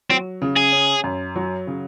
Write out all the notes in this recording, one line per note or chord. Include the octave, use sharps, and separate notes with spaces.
F#3 C4
C#3
G#4
C#4
F#2
F#3
C#3